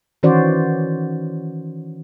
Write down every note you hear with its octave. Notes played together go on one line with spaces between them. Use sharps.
D#3 E3 C#4 F#4 C5 D5